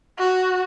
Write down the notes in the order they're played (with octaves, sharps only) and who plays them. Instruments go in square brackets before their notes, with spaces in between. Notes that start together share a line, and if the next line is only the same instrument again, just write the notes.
[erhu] F#4